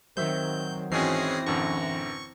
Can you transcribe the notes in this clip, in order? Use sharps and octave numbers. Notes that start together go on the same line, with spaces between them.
D#3 F#3 C4 C5 E5 G6
G#1 E3 C4 C#4 F#4 G#4 A#6 C7
A1 F#2 D3 C#6